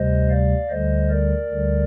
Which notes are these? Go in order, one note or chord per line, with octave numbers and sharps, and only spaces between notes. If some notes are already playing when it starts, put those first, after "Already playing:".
Already playing: D2 C3 G3 C5 D#5
D5 F5
D2 D3 G3 C5 D#5
A#4 D5
D2 D3 G3